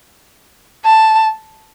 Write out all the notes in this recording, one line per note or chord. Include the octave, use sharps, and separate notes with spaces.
A5